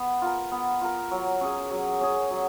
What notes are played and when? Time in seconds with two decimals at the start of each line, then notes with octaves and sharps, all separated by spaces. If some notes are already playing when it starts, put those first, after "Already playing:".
Already playing: B3
0.22 F4 A#4
0.52 B3
0.81 F4 A#4
1.11 F#3
1.41 C#4 G#4
1.71 F#3
2.01 C#4 G#4
2.31 F#3